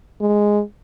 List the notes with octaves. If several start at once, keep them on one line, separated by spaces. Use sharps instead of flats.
G#3